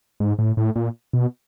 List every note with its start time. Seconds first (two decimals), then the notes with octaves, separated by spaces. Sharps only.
0.20 G#2
0.39 A2
0.57 A2
0.76 A#2
1.13 B2